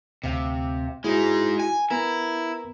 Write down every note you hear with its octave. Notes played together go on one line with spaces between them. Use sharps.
D2 C3 F5
G#3 D#4 E4 F#4 G#4
G#5
B3 E4 A#4 A#5